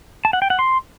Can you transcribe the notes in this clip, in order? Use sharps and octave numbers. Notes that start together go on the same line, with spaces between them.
A5
F#5
G5
F#5
C6